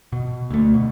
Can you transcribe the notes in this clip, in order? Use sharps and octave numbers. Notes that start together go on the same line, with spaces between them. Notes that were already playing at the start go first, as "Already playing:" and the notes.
B2
D2 A3
B2